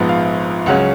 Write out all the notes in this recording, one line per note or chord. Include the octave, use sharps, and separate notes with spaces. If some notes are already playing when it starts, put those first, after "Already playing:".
Already playing: A#1 G#2 F3 B3
F5
C#2 C#3 F#3 C#4 F#5